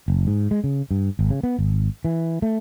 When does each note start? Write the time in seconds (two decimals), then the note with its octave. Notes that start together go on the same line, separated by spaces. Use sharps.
0.08 F#1
0.27 G#2
0.51 G#3
0.64 C#3
0.91 G2
1.19 G#1
1.30 C#3
1.43 B3
1.59 G#1
2.05 E3
2.42 A3